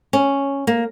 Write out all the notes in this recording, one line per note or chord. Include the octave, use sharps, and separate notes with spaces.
C#4
A#3